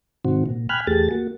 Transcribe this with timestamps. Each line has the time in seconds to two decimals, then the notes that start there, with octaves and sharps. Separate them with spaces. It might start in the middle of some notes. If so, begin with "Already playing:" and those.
0.25 G#2 C3 D#3 C4 F#4
0.46 A#2
0.69 G5 G#5 B5 F6 F#6
0.87 E2 A3 G4 G#4 A6
1.11 A#3 F#4